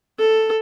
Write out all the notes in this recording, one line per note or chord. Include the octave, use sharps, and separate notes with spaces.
A4